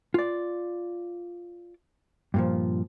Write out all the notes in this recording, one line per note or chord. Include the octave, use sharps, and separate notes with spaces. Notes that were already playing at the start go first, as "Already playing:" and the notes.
F4 D5
G2 A#2 F3